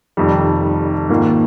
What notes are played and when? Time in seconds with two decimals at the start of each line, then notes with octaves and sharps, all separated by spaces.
0.17 F1 F2 D#3 G3
1.09 G#2 D#3 A#3 F4